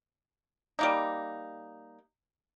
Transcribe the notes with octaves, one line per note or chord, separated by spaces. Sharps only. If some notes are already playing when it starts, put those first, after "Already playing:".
G3 A#3 D#4